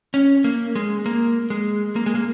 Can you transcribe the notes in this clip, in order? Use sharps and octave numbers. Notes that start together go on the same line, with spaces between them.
C#4
A#3
G#3
A#3
G#3
A#3
G#3
A#3